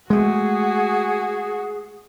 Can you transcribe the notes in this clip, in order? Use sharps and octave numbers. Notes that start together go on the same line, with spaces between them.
G#3 A3 F#4 G#4